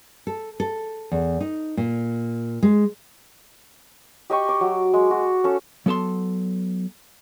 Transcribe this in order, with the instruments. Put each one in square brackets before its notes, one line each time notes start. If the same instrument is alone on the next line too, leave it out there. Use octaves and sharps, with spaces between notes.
[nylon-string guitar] A4
A4
E2
D#4
A#2
G#3
[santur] G4 D#5 G5 C#6
D6
F#3
G#3
F#4
C#4 A4
[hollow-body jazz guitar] F#3 B3 A4 A5 C6